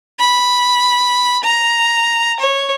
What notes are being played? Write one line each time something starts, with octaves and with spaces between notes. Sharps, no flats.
B5
A#5
C#5